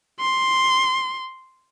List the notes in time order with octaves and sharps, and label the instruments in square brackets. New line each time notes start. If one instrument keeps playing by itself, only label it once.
[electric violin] C6